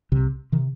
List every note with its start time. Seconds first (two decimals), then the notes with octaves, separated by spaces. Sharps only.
0.12 C2 C3
0.52 C3 D#3